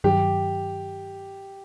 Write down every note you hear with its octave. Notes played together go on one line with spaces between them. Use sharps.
G2 D#3 F#3 G4